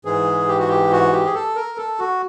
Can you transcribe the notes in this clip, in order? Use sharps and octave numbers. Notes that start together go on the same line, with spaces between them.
G#2 E3 G#4
G4
F#4
G4
F#4
G4
G#4
A4
A#4
A4
F#4